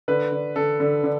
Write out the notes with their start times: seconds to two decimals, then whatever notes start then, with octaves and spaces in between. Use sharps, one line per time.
0.08 D3 B4
0.32 D3
0.56 D3 A4
0.80 D3
1.04 D3